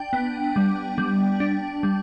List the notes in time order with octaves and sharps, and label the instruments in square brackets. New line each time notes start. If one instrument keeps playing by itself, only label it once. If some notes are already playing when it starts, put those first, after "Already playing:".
Already playing: [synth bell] D4 G5
B3
G3
G3
D4
G3